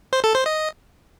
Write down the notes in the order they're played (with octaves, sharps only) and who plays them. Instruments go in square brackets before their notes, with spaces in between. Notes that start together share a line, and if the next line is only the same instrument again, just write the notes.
[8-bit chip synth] C5
A4
C5
D#5